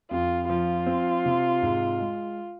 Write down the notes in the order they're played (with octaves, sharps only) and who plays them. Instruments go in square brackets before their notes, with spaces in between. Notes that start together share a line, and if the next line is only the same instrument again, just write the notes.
[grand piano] F2 [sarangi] F4
[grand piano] F3 [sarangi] F4
[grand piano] C4
C3
G#2
G#3